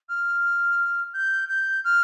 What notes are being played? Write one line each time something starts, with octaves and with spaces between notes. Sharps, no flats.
F6
G6
G6
F6